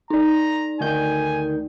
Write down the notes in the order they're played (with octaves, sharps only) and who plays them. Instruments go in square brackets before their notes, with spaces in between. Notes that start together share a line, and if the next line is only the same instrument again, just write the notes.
[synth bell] D#4 D5 [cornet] A#5
[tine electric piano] D2 D#3 G6 [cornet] G#5